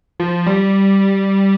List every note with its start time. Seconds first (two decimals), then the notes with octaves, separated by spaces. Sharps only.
0.20 F3
0.47 G3